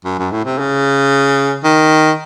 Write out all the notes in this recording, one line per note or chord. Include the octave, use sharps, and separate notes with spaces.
F#2
F#2
A2
C3
C#3
D#3